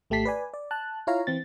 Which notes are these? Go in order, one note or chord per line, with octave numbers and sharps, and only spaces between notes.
G#1 A3 G4 A5 B6 C7
B4 D5 G#5
D5
A5 F#6
E4 F4 C#5 F5 A#5
E3 C4 A6